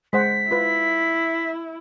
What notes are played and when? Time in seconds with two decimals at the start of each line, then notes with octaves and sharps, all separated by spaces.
0.13 G#3 C5 F#5 B6
0.51 E4 F4 B4